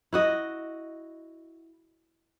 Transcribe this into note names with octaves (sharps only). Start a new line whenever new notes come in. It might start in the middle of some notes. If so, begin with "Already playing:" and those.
E4 F#4 D#5